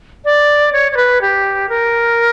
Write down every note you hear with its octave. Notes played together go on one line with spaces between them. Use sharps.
D5
C#5
C#5
B4
G4
A#4